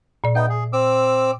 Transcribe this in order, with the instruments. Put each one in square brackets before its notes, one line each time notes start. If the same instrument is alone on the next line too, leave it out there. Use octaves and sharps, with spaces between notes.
[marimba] A#2 D5
[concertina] B3 D#4 G5 [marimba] E5
[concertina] G#4
C4 D6 E6